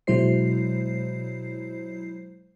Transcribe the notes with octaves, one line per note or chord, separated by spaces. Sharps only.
B2 F#3 G#3 E4 C5 C7